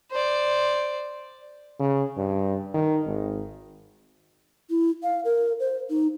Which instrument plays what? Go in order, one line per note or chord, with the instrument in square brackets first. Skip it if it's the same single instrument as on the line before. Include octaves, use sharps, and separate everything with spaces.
[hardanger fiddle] C5 D5
[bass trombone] C#3
G2
D#3
G#1
[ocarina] E4
F5
A#4
C5
D#4